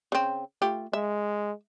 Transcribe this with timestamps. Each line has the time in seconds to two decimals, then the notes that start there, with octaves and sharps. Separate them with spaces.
0.12 C#3 C4
0.62 A3 F4 G4
0.93 G#3 E5